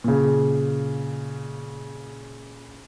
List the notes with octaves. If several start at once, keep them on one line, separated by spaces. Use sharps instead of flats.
A#2 C#3